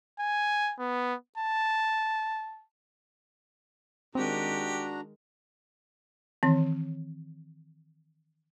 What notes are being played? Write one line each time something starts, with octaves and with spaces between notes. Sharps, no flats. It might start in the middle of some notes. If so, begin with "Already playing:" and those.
G#5
B3
A5
D#3 G#3 C4 D4 F#4 G4 A#4 A#5
D#3 E3 C4